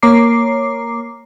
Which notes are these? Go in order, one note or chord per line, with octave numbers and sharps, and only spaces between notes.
A#3 C#5 A#5 D6 C7